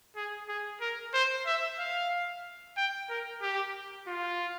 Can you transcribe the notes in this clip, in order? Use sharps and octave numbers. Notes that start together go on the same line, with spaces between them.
G#4
G#4
A#4
C5
E5
F5
G5
A#4
G4
F4